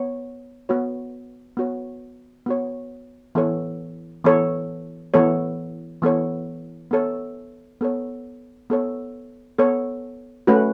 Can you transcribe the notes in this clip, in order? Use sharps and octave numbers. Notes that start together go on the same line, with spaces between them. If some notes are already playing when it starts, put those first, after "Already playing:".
Already playing: B3 C#5
B3 F#4 C#5
B3 F#4 C#5
B3 F#4 C#5
E3 B3 A4 C#5
E3 B3 A4 C#5
E3 B3 A4 C#5
E3 B3 A4 C#5
B3 A4 C#5
B3 A4 C#5
B3 A4 C#5
B3 A4 C#5
A3 C#4 F#4 B4